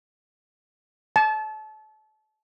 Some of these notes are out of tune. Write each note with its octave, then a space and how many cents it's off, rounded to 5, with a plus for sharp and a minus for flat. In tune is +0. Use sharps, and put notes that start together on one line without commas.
A5 -30